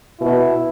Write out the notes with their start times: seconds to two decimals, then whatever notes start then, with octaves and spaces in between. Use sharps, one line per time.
0.20 B2 E4